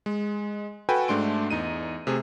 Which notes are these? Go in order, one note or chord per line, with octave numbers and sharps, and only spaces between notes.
G#3
F#4 A4 B4 G5 G#5
G#2 A3 D4 C6 D7
E2 D#4 D#7
C3 A3 G#4